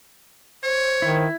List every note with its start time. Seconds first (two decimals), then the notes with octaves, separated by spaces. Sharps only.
0.64 C5 C#5
1.02 D#3 E4